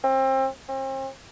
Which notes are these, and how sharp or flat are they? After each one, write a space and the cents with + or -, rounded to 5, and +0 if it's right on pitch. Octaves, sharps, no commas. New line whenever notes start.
C4 +30
C4 +40